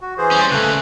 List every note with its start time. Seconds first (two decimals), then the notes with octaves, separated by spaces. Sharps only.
0.01 F#4
0.18 E3 G#4 C5
0.31 G3 C#4
0.51 C#2 C#3 A3 F#6